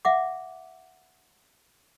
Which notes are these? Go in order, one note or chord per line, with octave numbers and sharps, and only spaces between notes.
E5 F#5 D6